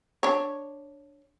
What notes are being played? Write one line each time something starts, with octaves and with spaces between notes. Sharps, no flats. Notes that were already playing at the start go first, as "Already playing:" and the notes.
D4 C#5